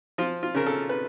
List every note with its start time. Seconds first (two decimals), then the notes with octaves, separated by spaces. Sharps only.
0.18 F3 F4
0.43 F4
0.55 C#3 A#4
0.67 A4
0.89 B4